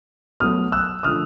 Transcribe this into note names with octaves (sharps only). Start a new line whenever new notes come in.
B2 F#3 A3 D#6 F6
E6 F#6
D3 F3 A3 D#6 F6